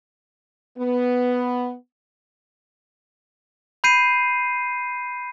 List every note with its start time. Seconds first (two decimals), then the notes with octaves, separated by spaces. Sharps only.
0.79 B3
3.84 B5 G6 C7 D#7